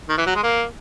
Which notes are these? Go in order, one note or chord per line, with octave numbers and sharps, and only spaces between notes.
D#3
E3
F#3
G#3
A#3